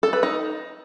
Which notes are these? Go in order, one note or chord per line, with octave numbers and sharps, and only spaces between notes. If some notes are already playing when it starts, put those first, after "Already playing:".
A4
B4
D#4